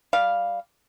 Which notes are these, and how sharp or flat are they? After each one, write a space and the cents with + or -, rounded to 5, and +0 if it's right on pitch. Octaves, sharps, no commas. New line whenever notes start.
G3 +0 F5 +0